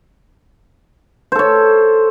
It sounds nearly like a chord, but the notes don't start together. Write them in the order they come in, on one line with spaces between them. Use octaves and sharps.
C5 A4 C#5